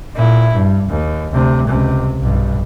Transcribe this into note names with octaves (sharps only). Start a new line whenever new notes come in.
A#2 E4
G2
D#2
D2 C3
C#2 C3
B1 G2